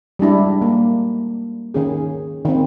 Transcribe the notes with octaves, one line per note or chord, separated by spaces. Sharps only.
G3 G#3 D4 E4
A#3
D#3 C#4 G#4
D#3 C4